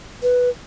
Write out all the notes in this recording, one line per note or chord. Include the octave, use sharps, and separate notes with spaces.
B4